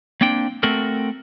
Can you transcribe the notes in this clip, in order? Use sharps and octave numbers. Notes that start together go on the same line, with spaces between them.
A#3 C4 D4 G5
A3 C4 F#4 A4 A#4